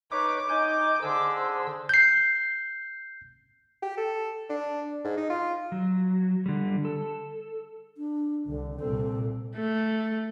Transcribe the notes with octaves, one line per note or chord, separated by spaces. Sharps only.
D#4 B4 C#5 D6
D#4 G#5 G6
D3 G#4 C5 E6
G6 C7
G4
A4
D4
G#2
D#4
F4
F#3
D3 G3
A4
D4
C2 D3
C2 A#2 C4 A4
A3